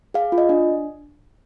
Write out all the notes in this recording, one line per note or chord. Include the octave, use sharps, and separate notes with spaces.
G#4 F5
F4
D#5
D4